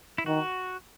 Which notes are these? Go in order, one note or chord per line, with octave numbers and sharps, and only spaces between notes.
E4
D#3 F#4